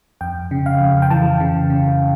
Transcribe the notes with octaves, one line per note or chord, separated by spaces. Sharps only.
F2 G5
C#3
F5
F2
G5
E3 A5
C#3
C#3